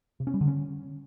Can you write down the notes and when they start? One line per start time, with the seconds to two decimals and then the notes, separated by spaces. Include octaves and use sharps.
0.20 C3
0.27 C#4
0.34 G3
0.41 D3
0.48 C#4